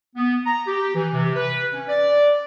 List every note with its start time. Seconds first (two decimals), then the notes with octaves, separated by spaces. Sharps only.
0.16 B3
0.45 A#5
0.68 G4
0.95 E3
1.13 C3
1.36 B4
1.73 C#4
1.88 D5